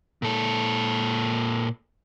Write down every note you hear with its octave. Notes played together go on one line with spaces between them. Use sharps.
A#2 A4